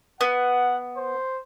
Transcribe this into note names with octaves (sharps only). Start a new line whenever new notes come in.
B3 F#5
C5